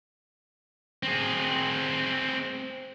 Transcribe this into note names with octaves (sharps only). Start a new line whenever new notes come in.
C4 G#4